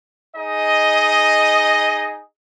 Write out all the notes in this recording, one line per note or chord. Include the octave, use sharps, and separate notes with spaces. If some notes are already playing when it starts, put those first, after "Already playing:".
D#4 G#4 D#5